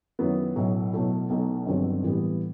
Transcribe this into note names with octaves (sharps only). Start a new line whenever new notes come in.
F#2 D#3 F#3 B3 E4
B1 A2 F#3
B2 F#3 A3 E4
B1 B2 A3 D#4
G1 G2 D#3 F#3 C4
A2 E3 G3 B3